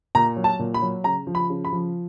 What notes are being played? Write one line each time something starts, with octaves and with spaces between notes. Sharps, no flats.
A#2 A#5
F#3
A5
A#2
B5
F#3
C#3 A#5
F3
B5
C#3
B5
F3